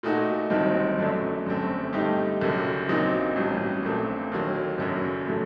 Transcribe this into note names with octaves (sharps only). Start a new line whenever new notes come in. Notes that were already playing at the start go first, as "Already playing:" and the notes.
A#2 A3 D#4 F#4
G1 G2 D#3 F#3 C4
F#2 D3 F#3 A3 D4
G1 F#2 D3 A3 C4
G2 D3 A3 D#4 G4
F#1 F#2 D3 F#3
A#1 A#2 F#3 C4 D#4
A1 G2 F#3
A#1 A#2 A3 C4
D#2 D3 F#3
F#1 F#2 D3 F#3
A2 F#3 A3